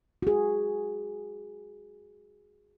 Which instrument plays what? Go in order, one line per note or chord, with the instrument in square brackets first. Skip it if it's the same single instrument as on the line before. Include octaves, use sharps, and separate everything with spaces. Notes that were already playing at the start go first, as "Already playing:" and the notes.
[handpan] F#4 G#4